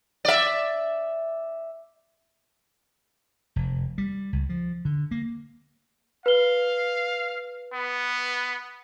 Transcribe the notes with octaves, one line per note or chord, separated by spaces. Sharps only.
D5 E5
F1
G3
C#2
F3
D3
A#3
B4 F5 G7
B3